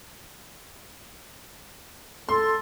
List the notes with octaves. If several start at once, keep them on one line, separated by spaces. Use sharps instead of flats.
A4 C6